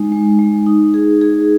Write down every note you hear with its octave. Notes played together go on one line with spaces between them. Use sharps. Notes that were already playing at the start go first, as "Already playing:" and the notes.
Already playing: G#3 D#4
G#3
G#3
D#4
G#4
G#4